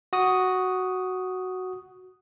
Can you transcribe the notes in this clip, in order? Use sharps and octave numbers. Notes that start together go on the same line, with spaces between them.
F#4 D#6